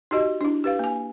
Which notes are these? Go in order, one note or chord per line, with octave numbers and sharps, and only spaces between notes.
D#4 F#4 G4 D#5
D4 E4
G4 B4 F5
A#3 G#5